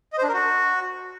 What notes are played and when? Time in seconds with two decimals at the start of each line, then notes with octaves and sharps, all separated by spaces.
0.13 D#5
0.18 C5
0.23 D4
0.28 A#4
0.34 F#4